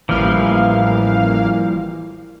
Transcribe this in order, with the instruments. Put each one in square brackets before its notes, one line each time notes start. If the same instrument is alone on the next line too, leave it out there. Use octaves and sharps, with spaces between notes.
[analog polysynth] A1 A#3 F5 [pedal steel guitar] E3 F3 G3